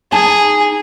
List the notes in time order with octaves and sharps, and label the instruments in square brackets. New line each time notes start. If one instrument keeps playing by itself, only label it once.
[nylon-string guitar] D#4 G#5 A5 [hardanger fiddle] G#4